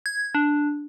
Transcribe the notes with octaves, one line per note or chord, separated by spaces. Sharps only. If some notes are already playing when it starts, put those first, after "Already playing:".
G#6
D4